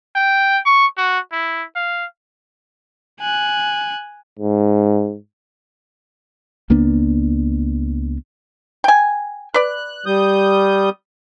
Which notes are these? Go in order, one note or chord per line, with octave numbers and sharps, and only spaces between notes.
G5
C#6
F#4
E4
F5
G#5 F#6
G#2
C#2 A#3 B3 D4
G5 G#5
B4 D5 F#6
G3 D#6 G6